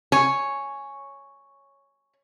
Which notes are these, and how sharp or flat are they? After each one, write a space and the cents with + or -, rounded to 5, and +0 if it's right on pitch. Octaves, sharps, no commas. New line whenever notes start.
C#5 +0 G#5 +5